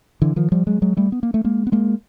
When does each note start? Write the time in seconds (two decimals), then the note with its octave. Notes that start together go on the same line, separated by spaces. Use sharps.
0.22 D3 E3
0.36 D#3 F3
0.52 F3 G3
0.67 F#3 G#3
0.82 F#3 G#3
0.97 G3 A3
1.12 B3
1.23 A#3
1.34 A3
1.44 G#3 A#3
1.67 B3
1.72 G#3 A#3